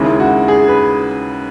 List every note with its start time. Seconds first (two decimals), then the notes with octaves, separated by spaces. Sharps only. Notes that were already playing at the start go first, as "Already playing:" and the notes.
Already playing: D#2 C#3 G#3 E4
0.20 F#4
0.48 G#4
0.68 B4